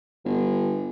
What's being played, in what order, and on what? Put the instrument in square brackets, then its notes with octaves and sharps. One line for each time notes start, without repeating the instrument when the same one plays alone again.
[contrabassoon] G1